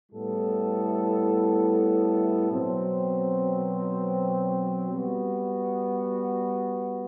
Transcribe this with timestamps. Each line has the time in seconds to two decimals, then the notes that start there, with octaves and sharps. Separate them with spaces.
0.12 A2 G3 B3 E4 A4
2.51 B2 F#3 C4
4.91 G3 B3 F#4